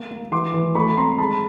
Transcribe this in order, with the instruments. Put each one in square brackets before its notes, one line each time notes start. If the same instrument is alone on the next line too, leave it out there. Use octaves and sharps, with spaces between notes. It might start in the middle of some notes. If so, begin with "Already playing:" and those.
Already playing: [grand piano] A#3 C#6
A#3
E3 C6 D6
E3
A3 B5 C#6
C4 A#5 C6
G#3 A5 B5